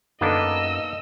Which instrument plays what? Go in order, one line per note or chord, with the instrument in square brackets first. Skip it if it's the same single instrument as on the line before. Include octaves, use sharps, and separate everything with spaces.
[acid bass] F#2 [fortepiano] D#3 A4 [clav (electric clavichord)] A#3 B3 D4 [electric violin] D#5 E6